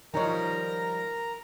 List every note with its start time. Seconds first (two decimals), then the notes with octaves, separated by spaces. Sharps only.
0.14 D#3 F3 G3 D#4 A#4 C#5 A#5